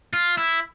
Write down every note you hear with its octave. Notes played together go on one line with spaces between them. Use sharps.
F4
E4